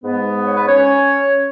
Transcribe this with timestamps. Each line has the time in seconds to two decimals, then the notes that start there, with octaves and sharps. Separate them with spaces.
0.02 G#2 G#3 B3
0.46 C#5
0.57 B4
0.67 C#4 C#5